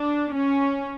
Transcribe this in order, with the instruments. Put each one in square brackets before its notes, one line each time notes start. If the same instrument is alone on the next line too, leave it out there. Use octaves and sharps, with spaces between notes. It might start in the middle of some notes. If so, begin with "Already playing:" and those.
Already playing: [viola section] D4
C#4